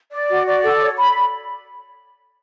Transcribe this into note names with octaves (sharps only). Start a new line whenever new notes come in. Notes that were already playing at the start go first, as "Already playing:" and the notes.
D5
F#4
D5
A4
C#5
B5